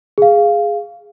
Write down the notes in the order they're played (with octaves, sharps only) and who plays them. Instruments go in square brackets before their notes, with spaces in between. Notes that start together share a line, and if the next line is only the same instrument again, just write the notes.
[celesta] G#4 F5